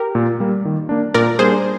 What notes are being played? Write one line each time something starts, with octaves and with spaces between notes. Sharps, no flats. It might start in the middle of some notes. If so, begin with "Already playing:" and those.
Already playing: G4 A#4
A#2
G3 A#3
D#3
A#3 D4
A#2 A#4 D5
G3 A#3 D4 G#4 C5